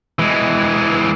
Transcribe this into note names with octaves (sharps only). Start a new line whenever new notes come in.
E3 G#3